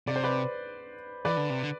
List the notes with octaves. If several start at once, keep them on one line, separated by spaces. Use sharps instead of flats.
C3 D5
C5
B4 D5
E3 B4 D5
D3
C3
D3